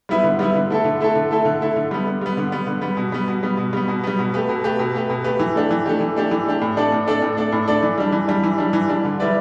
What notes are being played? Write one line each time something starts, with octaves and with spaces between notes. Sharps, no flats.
G3 B3 E4 B4
D3
G3 B3 E4 B4
D3
A3 E4 A4
D3
A3 E4 A4
D3
A3 E4 A4
D3
A3 E4 A4
D3
G3 B3
D3
G3 B3
D3
G3 B3
D3
G3 B3
B2
G3 B3
B2
G3 B3
B2
G3 B3
B2
G3 B3
B2
A3 G4 B4
B2
A3 G4 B4
B2
A3 G4 B4
B2
A3 G4 B4
E3
A3 D4 G4
E3
A3 D4 G4
E3
A3 D4 G4
E3
A3 D4 G4
A2
A3 D4 A4 D5
A2
A3 D4 A4 D5
A2
A3 D4 A4 D5
A2
A3 D4 A4 D5
E3
G3 D4
E3
G3 D4
E3
G3 D4
E3
G3 D4
D3
G3 E4 B4 D5